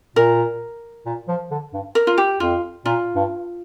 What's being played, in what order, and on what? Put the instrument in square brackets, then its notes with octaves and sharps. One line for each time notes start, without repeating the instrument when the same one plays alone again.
[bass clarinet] A#2 [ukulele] A#4
[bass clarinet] A#2
F3
D3
G2
[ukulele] A#4
F4
G4
[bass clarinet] F2 [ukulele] F4
[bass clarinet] A#2 [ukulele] F4
[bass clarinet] G2